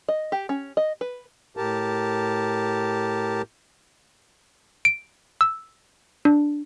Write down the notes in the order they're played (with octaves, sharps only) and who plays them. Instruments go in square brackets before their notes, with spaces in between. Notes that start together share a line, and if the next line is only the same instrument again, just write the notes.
[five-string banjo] D#5
G4
C#4
D#5
B4
[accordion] A2 G4 A#4 A5
[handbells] D7
E6
D4